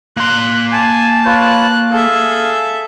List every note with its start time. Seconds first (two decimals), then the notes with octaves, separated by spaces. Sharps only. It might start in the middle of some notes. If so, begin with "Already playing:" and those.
0.17 A#3 C6 F#6
0.72 G#5 A5
1.26 F4 B4 C#5 F#6
1.92 G#4 A4 E5 F5